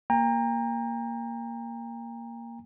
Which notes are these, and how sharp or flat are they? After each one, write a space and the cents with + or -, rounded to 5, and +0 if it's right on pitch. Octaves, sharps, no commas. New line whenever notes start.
A#3 +0 G5 +40 A#5 +0